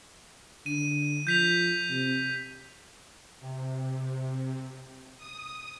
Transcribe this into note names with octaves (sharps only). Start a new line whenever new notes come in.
D3 D#7
F3 G6 B6 F7
C3
C3
D#6